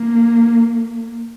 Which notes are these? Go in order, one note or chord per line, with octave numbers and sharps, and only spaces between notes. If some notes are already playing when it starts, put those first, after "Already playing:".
Already playing: A#3